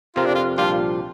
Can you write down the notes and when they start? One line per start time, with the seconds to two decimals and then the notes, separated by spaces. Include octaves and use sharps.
0.15 F2 C3 F3 C4 F4 A#4
0.25 D4
0.35 F4
0.58 C2 A#2 F3 D4 F4 G4